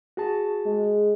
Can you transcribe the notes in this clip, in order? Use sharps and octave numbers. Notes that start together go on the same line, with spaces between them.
F#4 G#4 A5
G#3